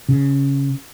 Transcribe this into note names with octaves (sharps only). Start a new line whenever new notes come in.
C#3